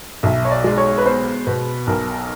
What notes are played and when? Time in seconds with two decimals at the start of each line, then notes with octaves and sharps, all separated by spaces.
0.23 B1 E5
0.45 C#5
0.51 D5
0.64 G#3 D5
0.78 C#5
0.98 B4
1.06 B3 C5
1.47 B2 B4
1.87 B1 A#4